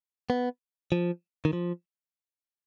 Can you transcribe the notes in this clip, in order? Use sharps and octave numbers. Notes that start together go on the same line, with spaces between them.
B3
F3
D#3
F3